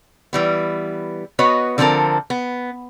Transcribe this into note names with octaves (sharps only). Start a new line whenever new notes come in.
E3 G3 B3
B3 F#4 B4 C#5 D#5
D3 F3 B3 C4 A4 A#4
B3